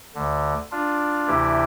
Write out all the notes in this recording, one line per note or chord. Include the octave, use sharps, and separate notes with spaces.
D2 D3
D4 F4
D2 C3 E3 E4 G4